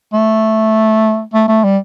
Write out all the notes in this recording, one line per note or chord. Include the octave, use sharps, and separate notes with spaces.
A3
A3
A3
G3